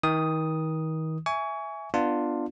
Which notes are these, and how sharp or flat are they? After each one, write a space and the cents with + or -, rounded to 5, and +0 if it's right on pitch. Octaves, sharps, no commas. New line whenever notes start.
D#3 +35 D#6 +0
E5 +0 G#5 +0 C#6 +30
B3 +0 D4 +20 F4 +0